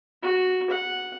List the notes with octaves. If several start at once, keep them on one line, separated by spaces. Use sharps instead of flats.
F#4
F#5